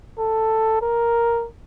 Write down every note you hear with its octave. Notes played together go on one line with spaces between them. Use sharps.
A4
A#4